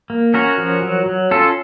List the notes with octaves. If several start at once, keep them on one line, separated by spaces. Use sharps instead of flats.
A#3
C#4 F#4 A#4
F3
F#3
F#3
C#4 F4 A4